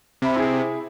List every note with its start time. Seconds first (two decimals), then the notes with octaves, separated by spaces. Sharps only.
0.22 C3 E5 B5
0.36 E4 G#4